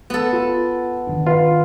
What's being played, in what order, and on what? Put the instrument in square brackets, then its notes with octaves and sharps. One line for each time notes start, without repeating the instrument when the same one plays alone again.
[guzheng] B3 A4
[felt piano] F4
[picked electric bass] D#3 D4
[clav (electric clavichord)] F4 [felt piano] B4 F5